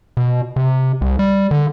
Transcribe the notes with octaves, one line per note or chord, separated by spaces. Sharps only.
B2
C3
C2
G3
D3